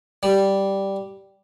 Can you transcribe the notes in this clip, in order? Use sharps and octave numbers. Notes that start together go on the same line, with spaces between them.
G3